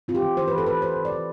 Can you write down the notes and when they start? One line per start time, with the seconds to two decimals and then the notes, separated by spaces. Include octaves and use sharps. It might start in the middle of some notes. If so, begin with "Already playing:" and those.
0.08 C4 F4
0.15 G4
0.22 E3
0.37 E3 C5
0.48 B4
0.53 E3
0.58 A4
0.66 E3 B4
0.82 E3 C5
0.96 E3
1.05 D5
1.12 E3